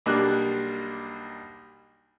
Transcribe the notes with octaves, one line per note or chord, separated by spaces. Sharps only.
B1 G3 A#3 D4 D5 F#6